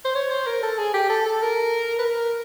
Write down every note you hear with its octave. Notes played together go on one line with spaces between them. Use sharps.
C5
C#5
C5
A#4
A4
G#4
G4
A4
A4
A#4
B4
A#4